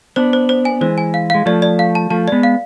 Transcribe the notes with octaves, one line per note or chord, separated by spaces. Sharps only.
B3 D4 C5
C5
C5
G#5
E3 G#3 C5
G#5
F5
G#3 F5
F3 A3 D5
D5
F5
A5
F3 A3 A5
G#3 B3 D5
F5